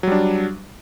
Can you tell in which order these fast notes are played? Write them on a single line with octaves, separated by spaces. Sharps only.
F#3 G3 D4